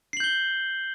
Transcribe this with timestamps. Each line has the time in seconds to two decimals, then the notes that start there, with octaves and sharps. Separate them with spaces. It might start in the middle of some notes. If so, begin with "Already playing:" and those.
0.13 C7
0.17 F#7
0.20 G6
0.24 G7